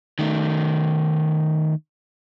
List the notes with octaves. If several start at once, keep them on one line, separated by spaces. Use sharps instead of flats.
D#3 A3